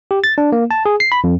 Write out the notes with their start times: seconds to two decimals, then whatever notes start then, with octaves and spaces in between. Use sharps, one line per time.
0.11 G4
0.24 A6
0.38 D4
0.52 A#3
0.71 A5
0.86 G#4
1.00 C7
1.12 B5
1.24 F2